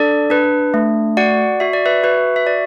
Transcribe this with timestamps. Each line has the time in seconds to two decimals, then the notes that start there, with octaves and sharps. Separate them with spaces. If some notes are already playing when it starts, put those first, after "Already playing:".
Already playing: D4 A4 D5
0.30 D4 B4
0.74 A3
1.17 F#4 D5 F#5
1.60 F#4 E5
1.73 D5
1.86 B4 E5
2.03 F#4 B4 E5
2.36 E5
2.47 F#4 D5